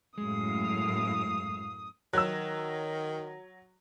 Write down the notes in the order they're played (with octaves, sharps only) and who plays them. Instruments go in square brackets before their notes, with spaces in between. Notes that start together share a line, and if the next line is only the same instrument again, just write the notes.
[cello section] F#2 A2 F5 [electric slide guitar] G#3 [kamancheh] D#6
[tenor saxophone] D#3 [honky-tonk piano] F#3 [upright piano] E6 F#6